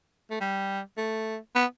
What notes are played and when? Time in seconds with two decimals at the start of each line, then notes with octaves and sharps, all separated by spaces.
0.31 A3
0.41 G3
0.97 A3
1.55 B3